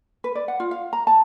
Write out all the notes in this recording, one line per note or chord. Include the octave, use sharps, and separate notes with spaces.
B4
D5
F#5
F4
F5
A#5
A5